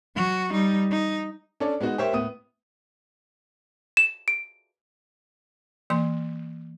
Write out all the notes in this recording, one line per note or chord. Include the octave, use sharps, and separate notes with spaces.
F#3 F#4
G3 D#4
D#4
C#4 D4 A4 C#5 D5
G#3 B3 D#4 F#4
G4 A#4 C5 C#5 E5
A2 B3 D#6 D#7
E7
D7
E3 A#3 C6